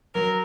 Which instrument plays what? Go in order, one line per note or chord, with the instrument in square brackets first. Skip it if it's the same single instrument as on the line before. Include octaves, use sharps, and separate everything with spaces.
[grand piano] F#3 [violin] A#4